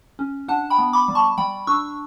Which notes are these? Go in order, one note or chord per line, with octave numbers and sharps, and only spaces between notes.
C#4
D4 F#5 A5
G5 B5
B3
B5 D6
G3
A5 C#6
G3 G5 B5
D4 C#6 E6